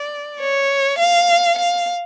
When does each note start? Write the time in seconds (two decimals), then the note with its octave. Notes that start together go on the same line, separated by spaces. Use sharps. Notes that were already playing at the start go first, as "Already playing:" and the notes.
Already playing: D5
0.40 C#5
0.99 F5
1.59 F5